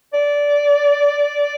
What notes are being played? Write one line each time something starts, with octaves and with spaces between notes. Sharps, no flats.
D5